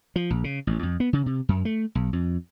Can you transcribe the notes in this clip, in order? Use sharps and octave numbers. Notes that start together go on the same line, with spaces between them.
F3
A#1
C#3
A1
F2
B3
C#3
C3
F#2
A3
B1
F2